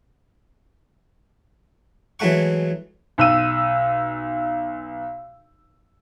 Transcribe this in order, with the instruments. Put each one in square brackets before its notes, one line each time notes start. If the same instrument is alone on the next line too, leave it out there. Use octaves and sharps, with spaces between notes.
[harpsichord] E3 F#3 G#3 A3 F#5 C#6
[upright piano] B1 E6 D#7